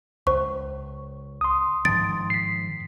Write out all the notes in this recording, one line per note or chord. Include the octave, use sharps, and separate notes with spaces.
C#2 C5 C#6
C6 D#6
G#2 D#3 F3 A6 D7
B6 C7